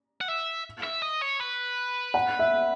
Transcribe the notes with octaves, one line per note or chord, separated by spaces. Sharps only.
F#5
E5
E5
D#5
C#5
B4
F#5
E5